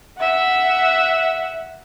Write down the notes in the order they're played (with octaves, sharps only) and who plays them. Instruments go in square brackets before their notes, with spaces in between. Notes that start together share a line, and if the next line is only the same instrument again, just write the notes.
[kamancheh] E5 F#5